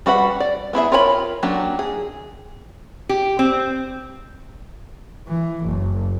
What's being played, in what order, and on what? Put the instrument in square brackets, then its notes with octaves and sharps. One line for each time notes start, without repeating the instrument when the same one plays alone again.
[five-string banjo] G3 F#4 B4 F#5 B5
D5
B3 E4 G#4 E5
F4 A#4 C#5 G5 B5
F#3 A#3 C#4 D4 G4
G#4
[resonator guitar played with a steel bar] G4
C4
[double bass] E3
F#1